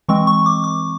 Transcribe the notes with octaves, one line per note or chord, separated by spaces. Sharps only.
E3 G#3 C4 C#6
C#6
D6
D6